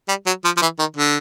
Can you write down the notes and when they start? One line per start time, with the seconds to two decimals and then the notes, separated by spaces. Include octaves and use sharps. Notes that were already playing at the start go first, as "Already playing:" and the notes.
0.08 G3
0.26 F#3
0.44 F3
0.57 F3
0.61 E3
0.79 D#3
0.96 D3